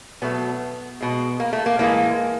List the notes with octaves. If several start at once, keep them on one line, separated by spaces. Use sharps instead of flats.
B2 F#3 A3 B3
B2 G#3
A#3
A3
A#3
A2 E3 G#3 A#3